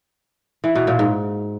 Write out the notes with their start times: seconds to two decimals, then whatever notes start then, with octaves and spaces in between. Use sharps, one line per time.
0.64 E3
0.75 B2
0.87 A#2
0.99 G#2